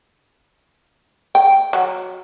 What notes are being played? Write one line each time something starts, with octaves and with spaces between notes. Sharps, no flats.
G5
F#3